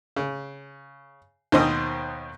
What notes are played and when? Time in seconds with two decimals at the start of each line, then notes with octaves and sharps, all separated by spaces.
0.16 C#3
1.52 D#2 B2 D#3 C5 D#5 D#6